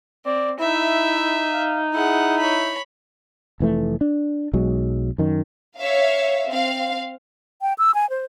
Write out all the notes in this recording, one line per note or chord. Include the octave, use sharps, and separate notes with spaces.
C4 D5
D#4 E4 E5
F5
E4 G#4 F#5
C#5 B5
F1 E3 A3
D4
B1 F#3 G#3
F#2 D#3
C#5 E5 F5
C4 F5
G5
E6
G#5
C5